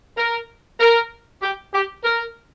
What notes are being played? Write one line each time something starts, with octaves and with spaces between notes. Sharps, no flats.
A#4
A#4
G4
G4
A#4